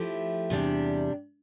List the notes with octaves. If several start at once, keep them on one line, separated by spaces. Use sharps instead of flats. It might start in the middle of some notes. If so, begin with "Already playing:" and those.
Already playing: F3 A3 E4 G4
E2 C3 G3 D4 G4